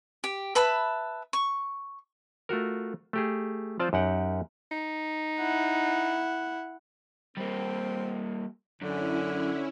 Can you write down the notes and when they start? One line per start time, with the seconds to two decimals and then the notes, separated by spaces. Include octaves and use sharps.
0.24 G4
0.55 B4 E5 A5 B5
1.33 C#6
2.49 A3 F4 F#4 A#4
3.13 A3 G4 G#4
3.79 F3 C4 F4 C5 D5 A5
3.93 F#2 D#4 G4 F#5 G5
4.71 D#4
5.39 E4 F#5
7.37 G3 A#3 C4
8.81 F#2 D3 C#4 E4